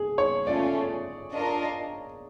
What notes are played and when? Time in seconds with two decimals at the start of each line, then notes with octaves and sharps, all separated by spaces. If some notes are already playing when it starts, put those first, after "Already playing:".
Already playing: G#4
0.18 C#5
0.47 A3 C#4 F4 D5
1.34 D4 F4 A#4 D#5